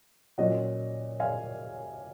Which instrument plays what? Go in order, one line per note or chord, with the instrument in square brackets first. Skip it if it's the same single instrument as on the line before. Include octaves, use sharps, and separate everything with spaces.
[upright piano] A#2 F#3 C#4 D#5 F#5
F5 G#5